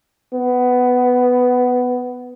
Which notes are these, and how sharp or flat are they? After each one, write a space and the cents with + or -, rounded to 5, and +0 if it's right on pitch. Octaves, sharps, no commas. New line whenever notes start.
B3 +10